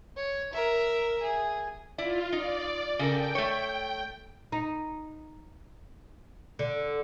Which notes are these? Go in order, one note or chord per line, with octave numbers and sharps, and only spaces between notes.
C#5
A#4 E5
G#4
E4 F4 D5
D#4 D5
C#3 A4 A#4 G5
A3 C#5
D#4
D3